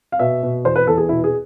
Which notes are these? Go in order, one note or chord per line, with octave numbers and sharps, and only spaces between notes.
F5
B2 E5
B2
E2 C5
B4
E2 A4
G#4
B2 E4
G#4